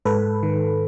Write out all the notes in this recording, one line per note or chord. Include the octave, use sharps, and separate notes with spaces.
G#2 A4 B4
D#3